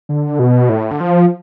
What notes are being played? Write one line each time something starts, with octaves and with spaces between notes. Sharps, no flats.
D3
B2
A2
D3
F3